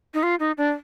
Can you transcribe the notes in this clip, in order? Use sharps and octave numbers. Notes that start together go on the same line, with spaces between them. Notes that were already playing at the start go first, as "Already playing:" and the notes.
D#4
F4
D#4
D4